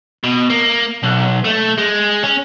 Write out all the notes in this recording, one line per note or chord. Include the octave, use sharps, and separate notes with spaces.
B2
A#3
B1
A3
G#3
C#4